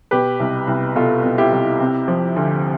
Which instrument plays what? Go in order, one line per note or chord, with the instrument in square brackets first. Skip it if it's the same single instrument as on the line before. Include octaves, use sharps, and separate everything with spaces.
[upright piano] B2 G4 B4
C2
C2
B2 F4 A4
B2
E4 G4
C2
C3
F3
D2